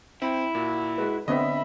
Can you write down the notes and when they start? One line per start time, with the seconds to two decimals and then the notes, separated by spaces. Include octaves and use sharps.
0.22 C4 E4 G5
0.55 A#2 F#4
0.98 G#3 F#4 B4
1.28 D3 B3 C4 D#5 E5 B5